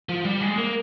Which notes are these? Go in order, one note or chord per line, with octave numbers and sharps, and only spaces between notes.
F3
G3
G#3
A#3